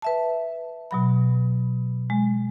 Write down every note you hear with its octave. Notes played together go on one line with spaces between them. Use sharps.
B4 E5 A5
B2 F#3 B5
G#3